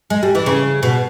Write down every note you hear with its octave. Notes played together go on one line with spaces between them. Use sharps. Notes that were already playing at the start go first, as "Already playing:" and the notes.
G#3
G3
E3
C#3
B2